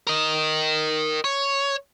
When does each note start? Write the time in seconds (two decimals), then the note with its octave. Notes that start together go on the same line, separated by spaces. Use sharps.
0.07 A#4 D#5
1.24 C#5